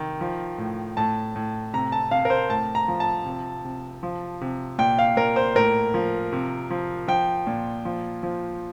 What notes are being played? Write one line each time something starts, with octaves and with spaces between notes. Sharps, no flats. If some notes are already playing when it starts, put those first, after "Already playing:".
Already playing: C3 D#3
F3
A2
A2 A5
A2
C3 A#5
A5
C3 F5
A#4
C5
A2 A5
A#5
F3
A5
C3
C3
F3
C3
A#2 G5
F5
A#2 A#4
C5
A2 A#4
F3
C3
F3
F3 G5
A#2
F3
F3